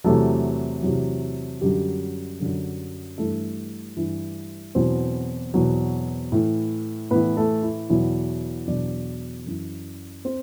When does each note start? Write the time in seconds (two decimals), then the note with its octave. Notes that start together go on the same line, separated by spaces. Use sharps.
0.04 E2 C3 F#3 A3 A4
0.83 E2 C3 F#3
1.61 F#2 D3 F#3 G3 G4
2.40 F#2 D3 F#3
3.18 G2 E3 A3 A4
3.97 G2 E3
4.75 E2 B2 F#3 C4 C5
5.54 E2 B2 F#3
6.32 A2 E3
7.10 A2 E3 B3 B4
7.37 A3 A4
7.63 E4
7.90 E2 B2 F#3 E4
8.67 E2 B2 F#3 D4 D5
9.46 F#2 E3
10.25 C4 C5